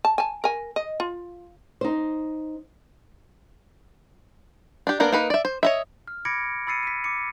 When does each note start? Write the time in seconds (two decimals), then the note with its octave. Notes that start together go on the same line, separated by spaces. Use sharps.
0.05 A5
0.18 G#5 A5
0.44 A#4 G#5
0.76 D#5
1.00 F4
1.81 D#4 C5
4.87 D4 G4
5.00 A#3 B3 D4 A#4
5.12 A#3 D#4 B4
5.30 D5 E5
5.45 C5
5.63 C#5 D#5 E5
6.08 F6
6.25 B5 D6 G#6 A#6 C#7 D7
6.67 B5 E6 A6 C7 C#7 D#7
6.83 B6 D#7
7.04 D6 C#7